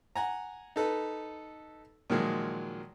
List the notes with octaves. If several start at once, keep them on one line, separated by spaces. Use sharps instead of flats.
F#5 G#5 A#5
D#4 A4 B4
A#2 D#3 F3 F#3 G#3